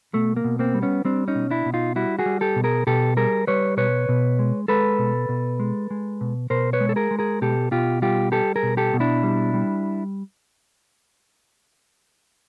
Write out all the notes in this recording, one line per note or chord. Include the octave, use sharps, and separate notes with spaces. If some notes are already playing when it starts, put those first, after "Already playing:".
B2 A3
A#3
B2
A#3 C4
G3
B3 C#4
G3 C4 D4
C#4 D#4
B2
D4 E4
B2
D#4 F4
G3 E4 F#4
F#4 G#4
G3
G4 A4
B2
G#4 A#4
B2 G4 A4
G3 G#4 A#4
G3 B4 C#5
B2 B4 C#5
B2
G#3
G#3 A4 B4
B2
B2
G#3
G#3
B2
B2 A#4 C5
B4 C#5
G#3
A4
G#4 A#4
G#3
G#4 A#4
B2 G4 A4
B2 F4 G4
G3 F4 G4
G3 G4 A4
G#4 A#4
B2
G4 A4
B2
D4 E4
G3
G3